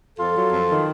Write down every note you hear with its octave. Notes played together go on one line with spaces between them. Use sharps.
F2 F4 A4
F#3
F2
D#3